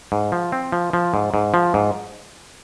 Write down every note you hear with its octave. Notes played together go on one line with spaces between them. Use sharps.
G#2
F3
C4
F3
F3
G#2
G#2
F3
G#2